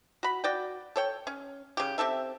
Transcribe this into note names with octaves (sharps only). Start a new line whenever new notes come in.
F#4 B5
F#4 D5 G5
A4 C#5 G5
C#4
C#3 G4
C4 G4 A4 E5